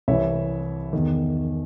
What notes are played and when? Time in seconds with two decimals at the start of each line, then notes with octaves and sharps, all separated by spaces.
0.08 C2 C3 E3 C#5 E5
0.93 E2 D#3